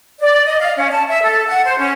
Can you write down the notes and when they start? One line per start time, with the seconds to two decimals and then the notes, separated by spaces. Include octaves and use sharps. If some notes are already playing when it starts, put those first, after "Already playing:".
0.19 D5
0.46 D#5
0.59 F5
0.77 C#4
0.91 A5
1.08 E5
1.23 A4
1.47 F#5
1.66 C5
1.78 C#4